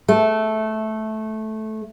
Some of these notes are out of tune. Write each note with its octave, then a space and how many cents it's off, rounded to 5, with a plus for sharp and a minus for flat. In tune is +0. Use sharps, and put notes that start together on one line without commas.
A3 -10